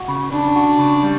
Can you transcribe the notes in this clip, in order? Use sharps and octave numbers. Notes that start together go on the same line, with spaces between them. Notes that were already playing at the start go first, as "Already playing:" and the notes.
Already playing: F#4
C#3
C#3 D4
F#4
C#3
G3